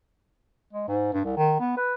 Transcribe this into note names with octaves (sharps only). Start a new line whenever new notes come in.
G#3
G#2
G2
C2
D#3
B3
B4